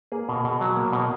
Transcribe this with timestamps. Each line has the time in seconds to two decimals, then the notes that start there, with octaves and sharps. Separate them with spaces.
0.12 A#3 G#4
0.29 B2
0.44 B2
0.61 F#3
0.77 A#3
0.93 B2